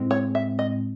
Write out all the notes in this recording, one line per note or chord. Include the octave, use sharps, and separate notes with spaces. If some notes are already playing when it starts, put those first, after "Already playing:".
Already playing: A2 G#3 C4
C#5
E5
D#5